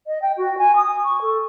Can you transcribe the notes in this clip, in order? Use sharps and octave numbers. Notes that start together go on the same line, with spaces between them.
D#5
G5
F#4
G#5
D#6
C#6
A4